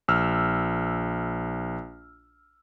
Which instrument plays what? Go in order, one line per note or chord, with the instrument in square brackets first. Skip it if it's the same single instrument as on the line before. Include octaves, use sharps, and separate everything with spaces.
[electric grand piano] A#1 E6 F6